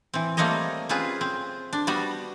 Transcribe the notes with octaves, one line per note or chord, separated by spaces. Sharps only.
E3 C4
G3 A3 A#3 C4 C#5 D#5
C4 C#4 F4 G#4 B4
C4
D4
G3 B3 F#4